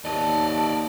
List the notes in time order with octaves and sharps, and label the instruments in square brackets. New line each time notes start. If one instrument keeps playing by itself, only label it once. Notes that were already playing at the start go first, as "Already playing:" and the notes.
[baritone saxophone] D#2 [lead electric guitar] D5 D#5 [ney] A5